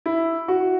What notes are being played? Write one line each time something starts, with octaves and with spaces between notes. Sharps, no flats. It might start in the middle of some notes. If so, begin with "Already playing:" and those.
E4
F#4